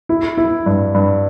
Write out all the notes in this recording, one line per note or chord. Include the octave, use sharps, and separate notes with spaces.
E4
E4
G2
G2